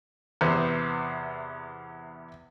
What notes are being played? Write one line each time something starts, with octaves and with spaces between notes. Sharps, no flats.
E2 C3 B3 C5